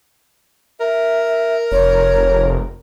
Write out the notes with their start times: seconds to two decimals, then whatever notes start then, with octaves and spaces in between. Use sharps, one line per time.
0.80 A#4 E5
1.72 F1 C#5